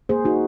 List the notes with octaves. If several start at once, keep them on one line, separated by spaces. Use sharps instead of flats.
A#3 G#4 C5
D#4 F#4